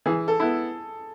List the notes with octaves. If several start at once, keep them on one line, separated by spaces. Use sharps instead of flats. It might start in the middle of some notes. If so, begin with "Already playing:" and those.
E3 G#4
A4
B3 E4